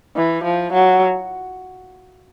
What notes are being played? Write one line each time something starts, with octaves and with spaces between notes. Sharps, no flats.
E3
F3
F#3